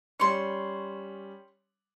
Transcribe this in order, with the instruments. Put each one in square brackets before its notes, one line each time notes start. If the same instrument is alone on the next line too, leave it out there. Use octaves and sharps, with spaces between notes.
[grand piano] G3 C#4 [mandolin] C6 C#6